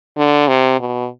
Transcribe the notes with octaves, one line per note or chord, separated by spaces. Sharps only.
D3
C3
B2